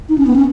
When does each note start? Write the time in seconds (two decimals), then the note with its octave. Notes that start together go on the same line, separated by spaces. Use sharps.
0.09 D#4
0.18 C#4
0.27 B3
0.36 C#4